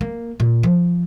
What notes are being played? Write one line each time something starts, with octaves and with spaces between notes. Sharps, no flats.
A#3
A#2
F3